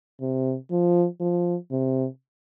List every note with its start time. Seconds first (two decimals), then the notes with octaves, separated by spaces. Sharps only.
0.21 C3
0.71 F3
1.20 F3
1.71 C3